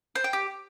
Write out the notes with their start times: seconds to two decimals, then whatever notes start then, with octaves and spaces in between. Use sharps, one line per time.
0.15 C5
0.24 G5
0.33 G4